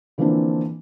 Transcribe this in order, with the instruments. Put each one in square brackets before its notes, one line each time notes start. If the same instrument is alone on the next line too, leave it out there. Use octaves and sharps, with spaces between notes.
[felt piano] D3 E3 F3 A#3 C4 D4